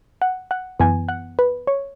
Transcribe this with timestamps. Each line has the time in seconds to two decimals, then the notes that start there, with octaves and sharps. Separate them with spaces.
0.22 F#5
0.51 F#5
0.79 F#2 E3 B3 G#5
1.09 F#5
1.39 B4
1.67 C#5